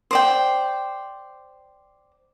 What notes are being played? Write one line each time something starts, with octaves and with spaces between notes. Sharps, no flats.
C5 D5 G5